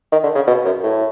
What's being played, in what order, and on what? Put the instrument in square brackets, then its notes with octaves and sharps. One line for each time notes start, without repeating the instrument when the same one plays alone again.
[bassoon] D#3
D3
C#3
B2
F#2
A2